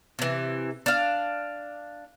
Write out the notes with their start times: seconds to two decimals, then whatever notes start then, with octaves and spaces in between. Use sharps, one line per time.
0.19 C3 E3
0.86 D4 F5